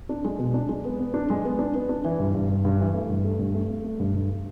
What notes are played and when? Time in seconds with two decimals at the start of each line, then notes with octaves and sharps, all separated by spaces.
0.09 D4
0.24 G#3
0.39 B2
0.54 D4
0.69 G#3
0.85 B3
0.99 B3
1.14 D4
1.30 G#3
1.45 B3
1.59 D4
1.75 B3
1.89 D4
2.04 E3
2.19 G2
2.34 G2
2.49 G2
2.65 G2
2.80 E3
2.94 A3
3.10 G2
3.24 A3
3.39 G2
3.54 A3
3.70 A3
3.84 A3
3.99 G2
4.14 G2